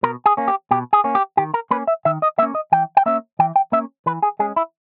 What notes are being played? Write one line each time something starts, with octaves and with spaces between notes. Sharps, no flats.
B2 A#4
G#4
A#3 C#4
G4
B2 G4
G#4
A#3 C#4
G4
D#3 G4
A#4
A#3 C#4 B4
E5
D#3 E5
D#5
A#3 C#4 E5
D#5
E3 G5
G5
A#3 C#4 E5
E3 G5
G5
A#3 C#4 E5
E3 B4
G#4
G#3 C#4 G#4
E4